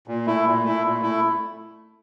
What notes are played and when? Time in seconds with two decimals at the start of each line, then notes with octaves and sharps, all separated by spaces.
0.08 A#2
0.26 A3 E4
0.46 A#2
0.64 A3 E4
0.83 A#2
1.02 A3 E4